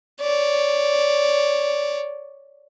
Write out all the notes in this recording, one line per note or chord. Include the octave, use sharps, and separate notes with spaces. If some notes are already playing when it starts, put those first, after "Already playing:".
C#5 D5